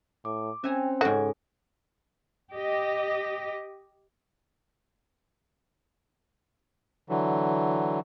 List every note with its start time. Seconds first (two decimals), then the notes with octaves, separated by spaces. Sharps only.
0.25 A2 D6
0.64 C4 C#4 E5 G5 G#5 A#5
1.01 G#2 C#3 F#4 A4
2.52 G4 D#5
7.09 D3 E3 F#3